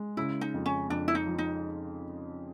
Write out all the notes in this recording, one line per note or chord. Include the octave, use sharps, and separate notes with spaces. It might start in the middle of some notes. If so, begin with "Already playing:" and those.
Already playing: G#3
C#3 E4
D#4
F2
C#4
F2 D4
E4
D#4
F3
D#4